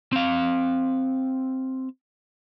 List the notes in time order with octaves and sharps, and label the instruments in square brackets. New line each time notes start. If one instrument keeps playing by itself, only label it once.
[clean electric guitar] C4 F5